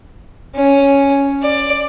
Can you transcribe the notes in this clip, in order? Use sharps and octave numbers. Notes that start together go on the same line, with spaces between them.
C#4
D5